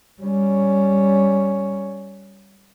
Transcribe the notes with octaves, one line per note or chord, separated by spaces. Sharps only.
G3 C#4